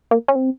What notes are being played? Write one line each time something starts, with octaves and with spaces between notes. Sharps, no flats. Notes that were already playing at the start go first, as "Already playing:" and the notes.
A#3
C#4
C4